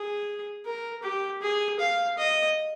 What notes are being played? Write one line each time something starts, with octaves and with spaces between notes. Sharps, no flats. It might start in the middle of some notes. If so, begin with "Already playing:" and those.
Already playing: G#4
A#4
G4
G#4
F5
D#5